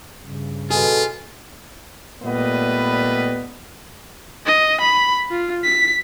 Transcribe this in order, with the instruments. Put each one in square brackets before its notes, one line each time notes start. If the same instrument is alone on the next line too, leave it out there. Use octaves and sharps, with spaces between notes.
[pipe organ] G2 C#3
[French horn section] B2 A4 [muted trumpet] F4 [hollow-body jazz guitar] G#4
[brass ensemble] A#2 G3 A3 B3 B4 D#5
[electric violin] D#5
B5
F4
B6